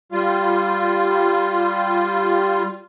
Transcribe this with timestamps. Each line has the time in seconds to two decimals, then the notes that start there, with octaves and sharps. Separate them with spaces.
0.12 G3 F4